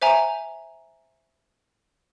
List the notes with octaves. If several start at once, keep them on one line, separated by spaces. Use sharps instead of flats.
C5 E5 G#5 A#5